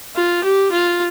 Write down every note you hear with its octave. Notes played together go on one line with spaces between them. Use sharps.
F4
G4
F4